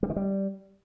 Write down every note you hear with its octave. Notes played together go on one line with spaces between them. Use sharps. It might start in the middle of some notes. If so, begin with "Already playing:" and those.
G3
D#3
G3